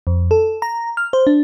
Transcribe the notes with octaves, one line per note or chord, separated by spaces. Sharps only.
F2
A4
A#5
F6
C5
D4